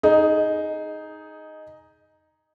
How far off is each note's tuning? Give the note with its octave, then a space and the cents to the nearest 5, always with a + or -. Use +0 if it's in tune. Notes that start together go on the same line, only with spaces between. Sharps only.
D#4 +0 G#4 +10